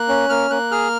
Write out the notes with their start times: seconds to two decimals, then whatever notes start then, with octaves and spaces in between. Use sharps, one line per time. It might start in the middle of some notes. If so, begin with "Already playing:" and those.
Already playing: A#3 F#6
0.09 C#4
0.29 A#3 F6
0.50 A#3 F#6
0.71 G#4 F6